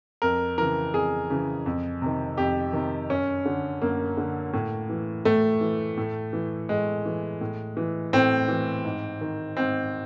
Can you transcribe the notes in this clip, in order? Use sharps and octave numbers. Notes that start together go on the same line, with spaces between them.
F2 A#4
C#3 E3 A#4
F2 G#4
C#3 E3
F2
C3 D#3
F2 G4
C3 D#3
F#2 C#4
D3
F#2 A#3
D3
A2
E3
A2 A3
E3
A2
E3
A2 G#3
E3
A2
E3
A2 C4
E3
G#2
D#3
G#2 C4